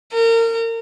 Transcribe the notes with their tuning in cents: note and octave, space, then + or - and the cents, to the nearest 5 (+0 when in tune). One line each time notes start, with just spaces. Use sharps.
A#4 -30